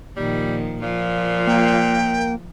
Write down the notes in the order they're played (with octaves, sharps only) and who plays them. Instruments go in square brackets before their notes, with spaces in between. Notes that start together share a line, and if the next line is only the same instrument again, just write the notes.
[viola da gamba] A#2 D#3 F3 [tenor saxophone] G3
[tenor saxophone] A#2 [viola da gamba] F3 F4
[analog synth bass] A#3 [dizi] G5